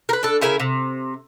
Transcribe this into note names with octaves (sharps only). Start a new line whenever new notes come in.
A#4 B4
D4 A4
C#3 E4 A#4 E5
C3